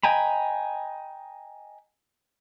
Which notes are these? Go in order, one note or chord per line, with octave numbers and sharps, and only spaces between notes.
D#5 G5 G#5 A#5 B5